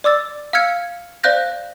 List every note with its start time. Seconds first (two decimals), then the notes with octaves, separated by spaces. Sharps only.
0.04 D5 D6 E6 A6
0.53 F5 E6 F6 G#6 C#7
1.24 C5 D5 F5 F#6 G6 A#6